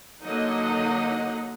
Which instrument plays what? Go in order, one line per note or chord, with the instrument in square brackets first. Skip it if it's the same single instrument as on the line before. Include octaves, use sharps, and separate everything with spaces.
[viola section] D3 F#3 A#3 D#4 D#5 F#5